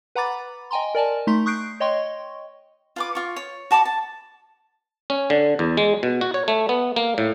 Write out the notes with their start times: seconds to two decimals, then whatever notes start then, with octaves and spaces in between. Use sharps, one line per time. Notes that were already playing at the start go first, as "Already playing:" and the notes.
0.15 B4 F#5 A#5 B5 D6 A6
0.71 D#5 G5 G#5 A#5 C6
0.95 A#4 D5 G#5 A5
1.27 A3 D#4 A#5 C6 B6
1.46 C#6 D#6 F#6 G6 C7 D7
1.80 C#5 D#5 G5 C6 C#6
2.96 F4 B4 D6
3.15 F4 C#6
3.36 C#5
3.71 F#4 A5 B5 D6
3.85 A5
5.10 C#4
5.30 D3
5.59 E2
5.77 G#3
6.03 B2
6.21 F#4
6.34 C#5
6.48 A3
6.69 B3
6.96 A#3
7.18 A2